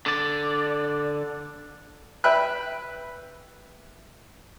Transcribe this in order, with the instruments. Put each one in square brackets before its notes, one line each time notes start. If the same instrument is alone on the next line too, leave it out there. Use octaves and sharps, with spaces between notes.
[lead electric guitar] D3 D5
[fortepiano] B4 E5 G5 B5 F#6